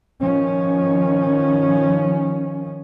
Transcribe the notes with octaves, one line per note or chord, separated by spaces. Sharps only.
D#3 F3 C#4